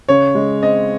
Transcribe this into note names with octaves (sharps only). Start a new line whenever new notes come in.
C#3 C#5
G#3
C4 D#5